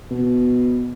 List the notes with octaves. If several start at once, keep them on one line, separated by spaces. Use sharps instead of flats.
B2